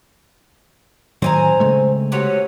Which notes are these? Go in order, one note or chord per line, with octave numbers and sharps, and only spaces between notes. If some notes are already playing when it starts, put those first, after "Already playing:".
A2 D#3 F#3 C4 G#5 A#5
C#3 G#3 A3
C3 F#3 C#4